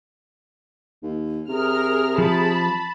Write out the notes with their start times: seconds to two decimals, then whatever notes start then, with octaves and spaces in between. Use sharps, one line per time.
1.03 D#2
1.49 C3 G#4 A#4 F6
2.18 F3 A5 B5